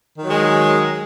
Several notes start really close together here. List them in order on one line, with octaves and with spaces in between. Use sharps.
D#3 F#3 G#3